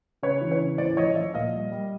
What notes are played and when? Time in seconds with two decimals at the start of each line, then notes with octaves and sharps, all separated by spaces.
0.23 C#3 B4 C#5
0.41 E3
0.51 B4 C#5
0.61 C#3
0.78 A2 C5 D5
0.97 F3 C#5 D#5
1.15 F3 D5 E5
1.34 A#2 D#5 F5
1.54 G3
1.72 G3